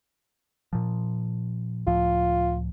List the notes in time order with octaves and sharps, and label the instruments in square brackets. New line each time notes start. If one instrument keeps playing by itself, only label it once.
[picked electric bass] A#2 F3
[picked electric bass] C#2 A2 F3 [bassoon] F4